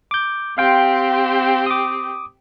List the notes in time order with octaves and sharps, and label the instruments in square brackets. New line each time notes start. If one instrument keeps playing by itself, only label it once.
[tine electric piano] D6 G6
[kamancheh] C4 G4 [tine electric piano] F5 G5 C6
[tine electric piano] D6 D#6